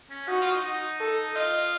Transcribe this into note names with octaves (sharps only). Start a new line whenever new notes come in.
C#4
D#4 F#4
F4
D#4
D#4
A4
F4 D#5